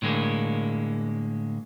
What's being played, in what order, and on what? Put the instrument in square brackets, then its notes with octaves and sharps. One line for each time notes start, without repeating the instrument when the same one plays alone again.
[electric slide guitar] A2 D3 G#3 A#3